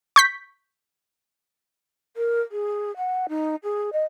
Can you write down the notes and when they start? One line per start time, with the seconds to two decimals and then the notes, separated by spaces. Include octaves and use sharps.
0.16 C#6 G6 B6
2.17 A#4
2.52 G#4
2.97 F#5
3.29 D#4
3.63 G#4
3.93 D#5